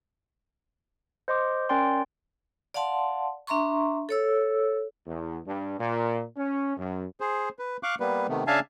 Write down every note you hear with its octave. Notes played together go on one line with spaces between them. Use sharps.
C5 D#5 C6 D6
C#4 A#4 D5 G5 C6
D5 F5 F#5 A5 C6
D4 E5 A#5 C6 C#6
A4 C#5 E6
E2
G2
A#2
C#4
F#2
G#4 C5
B4
F5 C#6 D6 F#6
G3 A#3 B3 B4
C3 D#3 A3 B3
C#3 D4 E5 F5 G#5 A5